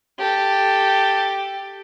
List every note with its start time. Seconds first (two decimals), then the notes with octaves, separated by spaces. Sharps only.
0.19 G4 A4